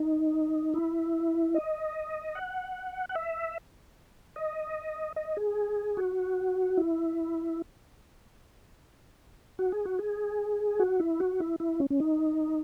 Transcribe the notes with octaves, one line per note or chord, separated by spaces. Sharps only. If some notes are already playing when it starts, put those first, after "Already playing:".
Already playing: D#4
E4
D#5
F#5
F#5
E5
D#5
D#5
G#4
F#4
E4
F#4
G#4
F#4
G#4
F#4
E4
F#4
E4
E4
C#4
C#4
D#4